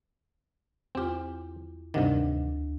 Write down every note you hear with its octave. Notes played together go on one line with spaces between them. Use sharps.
E2 C4 F4 G4
D2 G2 C3 D#3 D4 D#5